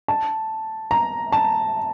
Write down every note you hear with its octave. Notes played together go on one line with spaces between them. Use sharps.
A5
A#5
A5